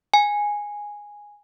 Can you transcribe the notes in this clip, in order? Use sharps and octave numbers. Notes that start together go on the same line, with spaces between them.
G#5